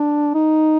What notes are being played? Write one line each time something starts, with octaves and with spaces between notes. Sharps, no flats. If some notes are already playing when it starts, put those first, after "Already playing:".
Already playing: D4
D#4